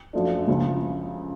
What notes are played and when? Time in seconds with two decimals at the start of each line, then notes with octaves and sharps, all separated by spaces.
0.13 F#2 F3 A3 D4
0.47 C#2 C#3 F3